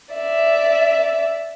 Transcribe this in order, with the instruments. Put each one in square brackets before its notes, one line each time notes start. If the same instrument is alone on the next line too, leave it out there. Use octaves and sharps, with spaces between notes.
[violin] D5 E5